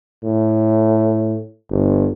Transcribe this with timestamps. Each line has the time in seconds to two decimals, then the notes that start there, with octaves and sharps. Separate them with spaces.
0.23 A2
1.70 G1